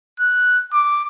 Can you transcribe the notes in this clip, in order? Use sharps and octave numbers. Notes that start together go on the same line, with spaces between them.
F#6
D6